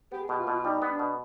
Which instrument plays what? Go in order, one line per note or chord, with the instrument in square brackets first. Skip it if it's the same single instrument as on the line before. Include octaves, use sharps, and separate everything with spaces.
[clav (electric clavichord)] B3 [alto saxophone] G4
[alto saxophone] G#4
[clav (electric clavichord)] B2 [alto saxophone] G4
[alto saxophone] F4
[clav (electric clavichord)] B2
[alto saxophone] F4
[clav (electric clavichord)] G3 [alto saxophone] D#4
[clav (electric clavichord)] B3
[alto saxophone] D4
[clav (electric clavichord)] B2